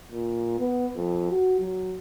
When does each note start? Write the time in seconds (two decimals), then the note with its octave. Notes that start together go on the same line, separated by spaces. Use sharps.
0.12 A#2
0.59 B3
0.96 F2
1.31 F#4
1.60 F#3